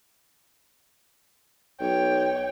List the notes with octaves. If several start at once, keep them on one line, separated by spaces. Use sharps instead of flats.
B1 C#5 G5